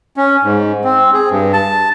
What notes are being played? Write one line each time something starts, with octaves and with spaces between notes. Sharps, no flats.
C#4
G#2
C4
G#4
G2
A5